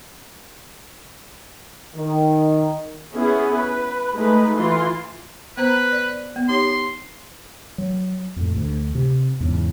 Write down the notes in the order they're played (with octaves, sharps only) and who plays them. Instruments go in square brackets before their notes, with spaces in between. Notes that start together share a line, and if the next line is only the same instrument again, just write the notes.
[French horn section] D#3
[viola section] B3 C#4 E4 G#4
B4
G#3 A3 D#4 B4
E3 F4 C6
[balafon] B3 C5 A#5 [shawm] B4
[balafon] D5
B3
[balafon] D#4 G4 C#5 [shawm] C6
[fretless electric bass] F#3
F2 A2
D2
C3
E2 G#2 C#3